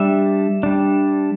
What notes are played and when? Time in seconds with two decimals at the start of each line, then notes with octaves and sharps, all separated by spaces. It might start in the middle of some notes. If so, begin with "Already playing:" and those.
Already playing: G3 D4 E5
0.63 G3 D4